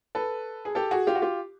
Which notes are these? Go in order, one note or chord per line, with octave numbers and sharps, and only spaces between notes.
A4 B4
G#4
G4 A4
F#4 G#4
F4 G4
F#4
F4 G4